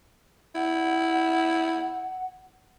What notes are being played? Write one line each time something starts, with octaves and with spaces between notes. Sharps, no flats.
E4 F#5